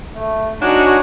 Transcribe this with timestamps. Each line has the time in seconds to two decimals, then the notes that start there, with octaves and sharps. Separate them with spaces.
0.15 A3
0.61 D4 D#4 F#4 C#5 G#5